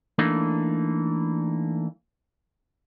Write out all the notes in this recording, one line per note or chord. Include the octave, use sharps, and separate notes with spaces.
E3 A3 A#3 D4 D#4